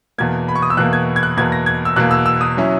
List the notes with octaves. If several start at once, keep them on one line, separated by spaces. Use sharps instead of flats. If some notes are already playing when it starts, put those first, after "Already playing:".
E2 B2 A#3 G#6
B5
C#6
D#6
E6
E2 B2 A#3 F#6
G#6
G#6
F#6
E2 B2 A#3 G#6
A#6
G#6
E6
E2 B2 A#3 F#6
E6
E6
D#6
F#3 C#4 E4